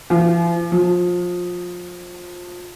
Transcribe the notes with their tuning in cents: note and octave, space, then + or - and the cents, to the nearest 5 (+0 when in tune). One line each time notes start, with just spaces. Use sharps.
F3 -40
F3 +25